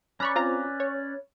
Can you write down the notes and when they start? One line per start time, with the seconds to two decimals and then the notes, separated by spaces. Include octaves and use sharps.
0.20 C#4 B4 D5 A#5 B5 C#6
0.36 C4 F4 A#5
0.80 C#5